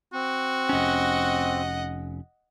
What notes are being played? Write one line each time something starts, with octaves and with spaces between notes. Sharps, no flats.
C4 F#4
F1 C#4 D#5 F#5